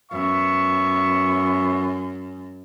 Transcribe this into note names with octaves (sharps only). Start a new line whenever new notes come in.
F#2 B3 E5 C#6